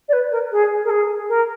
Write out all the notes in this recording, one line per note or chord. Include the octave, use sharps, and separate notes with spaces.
D5
B4
A#4
G#4
A#4
G#4
A#4